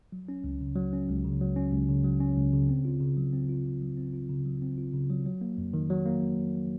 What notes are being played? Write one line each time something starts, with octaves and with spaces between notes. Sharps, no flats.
F#3
C#4
C#2
C#3
F#3
C#4
C#2
C#3
F#3
C#4
C#2
C#3
F#3
C#4
C#2
C#3
C4
F4
C#3
F#3
C4
F4
C#3
F#3
C4
F4
C#3
F#3
C4
F4
C#3
F#3
F#3
A#3
F2
D#3
F#3
A#3